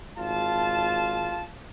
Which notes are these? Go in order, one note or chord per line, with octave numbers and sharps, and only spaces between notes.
G#1 F4 A5